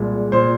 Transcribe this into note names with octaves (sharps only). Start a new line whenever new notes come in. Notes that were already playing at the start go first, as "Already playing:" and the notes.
Already playing: C2 A#2 G#3
A#2 G#3 C5 C6